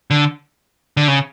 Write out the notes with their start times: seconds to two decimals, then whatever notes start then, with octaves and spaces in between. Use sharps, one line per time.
0.11 D3
0.97 D3
1.08 C#3